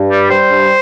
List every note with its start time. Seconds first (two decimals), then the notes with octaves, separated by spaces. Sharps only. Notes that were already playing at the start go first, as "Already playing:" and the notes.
Already playing: G2
0.09 G3
0.30 G3 C5
0.51 G2